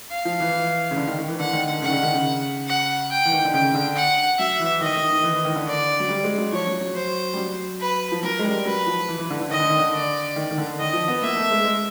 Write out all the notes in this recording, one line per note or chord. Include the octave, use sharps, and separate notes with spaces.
F5
F3
E3
C#3
D3
D#3
D#3
E3
D3 F#5
D#3
D3
C#3 F#5
D#3
D3
D#3
C#3
F#5
G5
E3
D#3
D3
C#3 G5
D3
F#5
F#3 E5
E3
D#3 D#5
D#3
D#3
E3
E3
D#3
D3
D5
F#3
G3
G#3
F#3
F3 C#5
F#3
F#3
C5
G3
F#3
B4
F3
F#3 A#4
G#3
G3
F#3 B4
F3
E3
E3
D3
D3
D#3 D#5
D3
D#3
D3
D5
D#3
D#3
D3
D#3 D#5
F3
B3
A#3 E5
A3
G#3
G#3